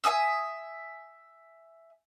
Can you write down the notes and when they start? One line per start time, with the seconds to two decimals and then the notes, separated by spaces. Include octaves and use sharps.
0.04 E5 G#5 D#6 E6